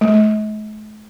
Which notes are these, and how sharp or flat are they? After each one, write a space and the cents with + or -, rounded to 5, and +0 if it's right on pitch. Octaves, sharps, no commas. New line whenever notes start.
A3 -45